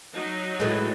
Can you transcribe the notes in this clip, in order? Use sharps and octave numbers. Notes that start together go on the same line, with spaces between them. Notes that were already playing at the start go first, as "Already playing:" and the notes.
F#3 D#4
A2 E3 G#3